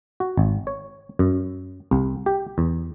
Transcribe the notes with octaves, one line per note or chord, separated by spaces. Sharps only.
F#4
G#1
C#5
F#2
C2
G4
E2